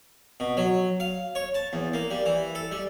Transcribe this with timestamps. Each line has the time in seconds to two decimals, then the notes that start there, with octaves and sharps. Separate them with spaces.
0.40 B2
0.57 F#3
1.00 F5
1.35 C#5
1.54 A5
1.73 E2
1.94 A#3
2.11 G3
2.25 E3
2.55 A4
2.71 G3